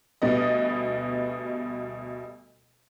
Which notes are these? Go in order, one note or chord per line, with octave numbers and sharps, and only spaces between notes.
D2 B2 G3 B3 D#5